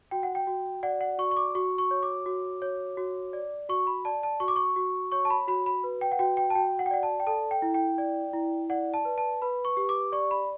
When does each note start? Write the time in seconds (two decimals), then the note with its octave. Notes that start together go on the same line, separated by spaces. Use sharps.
0.11 F#4 G5
0.23 F#5
0.35 G5
0.47 F#4
0.83 D5 F#5
1.01 F#5
1.18 F#4 C#6
1.31 C#6
1.36 D6
1.55 F#4 C#6
1.78 C#6
1.91 C#5
2.03 D6
2.26 F#4
2.62 C#5
2.97 F#4
3.33 D5
3.69 F#4 C#6
3.87 B5
4.05 D5 A5
4.23 A5
4.40 F#4 C#6
4.48 D6
4.56 C#6
4.76 F#4
5.12 C#5 C#6
5.25 A5
5.30 B5
5.48 F#4 B5
5.66 B5
5.84 B4
6.01 G5
6.12 F#5
6.19 F#4 G5
6.37 G5
6.50 A5
6.55 F#4 G5
6.79 F#5
6.86 G5
6.91 D5 F#5
7.03 A5
7.20 G5
7.27 A4 A5
7.51 G5
7.62 E4
7.74 G5
7.98 D5
8.33 E4
8.70 D5 F#5
8.94 A5
9.05 B4
9.18 A5
9.42 B4 B5
9.65 C#6
9.77 G4
9.89 D6
10.12 D5 C#6
10.31 B5